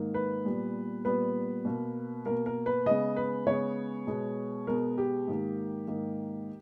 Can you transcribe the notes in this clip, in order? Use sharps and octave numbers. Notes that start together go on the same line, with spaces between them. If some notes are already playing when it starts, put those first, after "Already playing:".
Already playing: G#2 D#3 A#3
B4
A#2 G3 B3
A#2 G3 B3 B4
B2 A#3
B2 A#3 A#4
A#4
B4
C#3 G#3 B3 D#5
B4
C#3 G#3 B3 C#5
B2 G#3 B3
B2 G#3 B3 A#4
G4
G#2 D#3 A#3
G#2 D#3 A#3